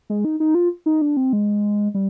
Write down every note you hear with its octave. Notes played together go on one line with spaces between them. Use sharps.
G#3
D#4
D#4
F4
D#4
D4
C4
G#3
G3